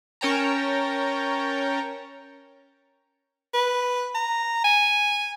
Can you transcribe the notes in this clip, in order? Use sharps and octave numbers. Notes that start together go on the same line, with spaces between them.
C#4 A#4 C#5 G5 A5 A#5
B4
A#5
G#5